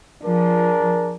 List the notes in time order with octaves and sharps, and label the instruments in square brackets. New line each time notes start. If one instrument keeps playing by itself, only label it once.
[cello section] F3 [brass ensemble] D4 G#4 A#4